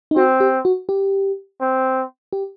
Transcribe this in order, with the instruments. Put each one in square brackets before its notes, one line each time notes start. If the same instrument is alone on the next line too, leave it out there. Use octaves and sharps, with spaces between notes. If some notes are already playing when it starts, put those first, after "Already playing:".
[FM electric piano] D#4
[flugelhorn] C4 [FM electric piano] F#4
[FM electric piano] G4
F#4
G4
[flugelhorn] C4
[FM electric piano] G4